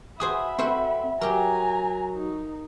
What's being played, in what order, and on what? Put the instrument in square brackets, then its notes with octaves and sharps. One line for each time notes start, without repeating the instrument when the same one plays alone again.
[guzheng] F#4 G#4 C5 [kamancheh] E5 B5 [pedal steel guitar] D#6
[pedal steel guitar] C4 A4 [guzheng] E4 F#4 C5
[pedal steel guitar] F#3 [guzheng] G4 A#4 [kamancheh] G#5 A#5
[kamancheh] D#4